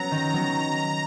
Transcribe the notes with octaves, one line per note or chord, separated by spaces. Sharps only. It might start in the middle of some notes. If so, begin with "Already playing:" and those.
Already playing: F#3 B3 C#4 A#5
D#3
F#3 B3